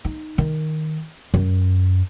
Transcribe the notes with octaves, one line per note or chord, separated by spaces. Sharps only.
D#4
D#3
F#2